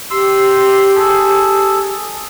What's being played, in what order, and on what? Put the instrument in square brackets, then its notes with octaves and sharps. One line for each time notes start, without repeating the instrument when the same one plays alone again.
[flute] G4 [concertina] C6 E6
[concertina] G#4 A4